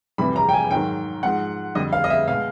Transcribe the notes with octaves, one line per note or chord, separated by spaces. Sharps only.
F2 C3 E3 G3 B5
A#5
G5
G#5
G#2 D#3 F#3 G5
G#2 F3 G#3 F#5
F2 D3 G3 D#5
F5
D#5
E5
B2 G#3 F5